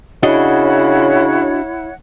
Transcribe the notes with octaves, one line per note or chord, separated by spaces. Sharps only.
C#3 D4 E4 F#4 C#5 D#5 E5 F#5